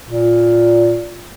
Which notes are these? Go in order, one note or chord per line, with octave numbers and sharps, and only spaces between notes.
A#2